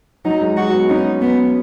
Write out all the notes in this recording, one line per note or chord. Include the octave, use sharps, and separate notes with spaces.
F#3 D#4
G#3
G#3 F#4
B3
C#4 D#4
B3